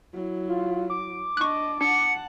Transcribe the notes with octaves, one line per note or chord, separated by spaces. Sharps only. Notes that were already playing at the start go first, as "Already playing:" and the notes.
F#3 E4
F4
D6
D4 D#5 C#6 F#6
D4 F#5 A5 C#7